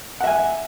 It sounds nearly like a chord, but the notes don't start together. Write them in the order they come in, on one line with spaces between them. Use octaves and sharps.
F#5 E5 G#5